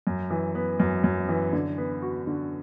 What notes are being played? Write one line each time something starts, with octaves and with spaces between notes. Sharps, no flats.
F#2
E3
B3
F#2
F#2
E3
D3
B3
F#4
D3